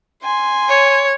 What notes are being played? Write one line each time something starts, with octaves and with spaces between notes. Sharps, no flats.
G#5 C6
C#5